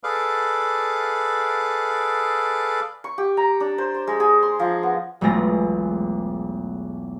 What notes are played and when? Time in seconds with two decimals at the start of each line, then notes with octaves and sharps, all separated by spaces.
0.04 G#4 A4 B4 D5 F5
3.04 C#6
3.18 G4
3.37 A#5
3.60 D4
3.78 C5
3.94 C5
4.07 G#3
4.20 G#4
4.42 C6
4.59 F3
4.83 B3
5.21 E1 B1 G#3 A3 F4 A#6